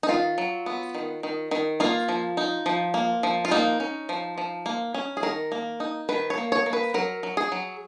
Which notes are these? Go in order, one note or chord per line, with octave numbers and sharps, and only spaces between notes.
D#4
D#3 F4
F#3
B3
D#3
D#3
D#3
A#3 F4
F3
D#4
F3
A#3
F3
F4
A#3 D#4
C#4
F3
F3
A#3
C#4
G#4
D#3 A#4
A#3
D#4
D#3 B4
C#5
A#3
C#5
A#3
B4
F#3 A#4
F#3
G#4
F#3